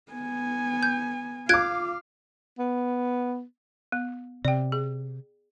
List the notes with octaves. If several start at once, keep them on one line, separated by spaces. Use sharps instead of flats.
B3 G#5
G6
F4 F5 D6 F#6 G#6 D7
B3
B3
C3 D5 G5
G#4